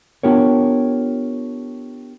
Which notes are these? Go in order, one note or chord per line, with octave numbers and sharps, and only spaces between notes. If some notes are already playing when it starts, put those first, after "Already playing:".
B3 D4 F4 G4 A#4 C#5